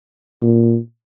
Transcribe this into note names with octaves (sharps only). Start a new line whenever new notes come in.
A#2